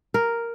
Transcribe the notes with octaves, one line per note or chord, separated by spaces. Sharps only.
A#4